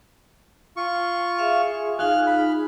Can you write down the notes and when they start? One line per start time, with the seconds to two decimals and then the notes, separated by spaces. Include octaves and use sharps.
0.77 F4 C#6
1.39 G#4 E5 F5
1.99 D#4 F4 F5 F6 F#6
2.27 B5